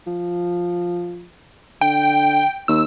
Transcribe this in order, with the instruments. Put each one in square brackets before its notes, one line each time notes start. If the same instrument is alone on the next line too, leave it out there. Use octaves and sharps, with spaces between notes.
[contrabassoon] F3
[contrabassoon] D3 [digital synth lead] G5
[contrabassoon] D#2 [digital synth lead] E6